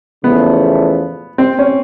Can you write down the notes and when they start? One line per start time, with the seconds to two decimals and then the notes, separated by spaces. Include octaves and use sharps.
0.24 E2 C#3 F3 A3 B3
1.38 C4
1.59 C#4